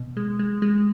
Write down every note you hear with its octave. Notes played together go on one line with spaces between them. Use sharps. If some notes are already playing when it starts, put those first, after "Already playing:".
Already playing: B2
G#3
G#3
G#3